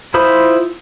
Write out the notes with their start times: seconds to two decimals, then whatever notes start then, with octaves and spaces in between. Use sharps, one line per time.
0.14 E4 F4 C5 B5 D#6